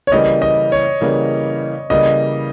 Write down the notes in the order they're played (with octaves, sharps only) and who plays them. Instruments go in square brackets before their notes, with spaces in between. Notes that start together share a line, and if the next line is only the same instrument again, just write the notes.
[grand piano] C#5
[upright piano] C#3 E3 G3 A#3 [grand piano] D#5
[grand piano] D#5
C#5
[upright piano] C#3 E3 G3 A#3
[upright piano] C#3 E3 G3 A#3 [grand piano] D#5